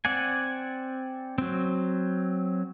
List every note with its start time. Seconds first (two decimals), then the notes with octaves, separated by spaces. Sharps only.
0.05 C4 D5 F#5 G#5
1.38 F#3 C4